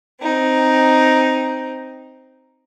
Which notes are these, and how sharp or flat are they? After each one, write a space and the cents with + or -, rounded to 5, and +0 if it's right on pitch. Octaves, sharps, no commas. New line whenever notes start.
C4 +0 D#4 +0